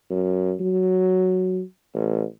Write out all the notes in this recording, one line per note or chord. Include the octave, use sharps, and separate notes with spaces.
F#2
F#3
A1